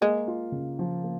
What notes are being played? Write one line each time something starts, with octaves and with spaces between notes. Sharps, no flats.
G#3 A#3
F4
C#3
F3
A#3